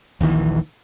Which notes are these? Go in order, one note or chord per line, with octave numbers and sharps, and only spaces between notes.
D#1 A#1 D#3 E3